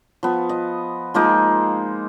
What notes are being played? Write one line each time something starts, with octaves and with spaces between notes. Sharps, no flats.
F3 B3
D#5
F3 G#3 A#3 D#4